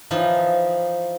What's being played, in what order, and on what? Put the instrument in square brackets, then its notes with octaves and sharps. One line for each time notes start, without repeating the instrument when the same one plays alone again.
[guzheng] E3 F3 D#4